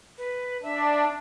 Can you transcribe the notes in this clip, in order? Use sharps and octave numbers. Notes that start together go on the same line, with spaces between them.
B4
D4 E5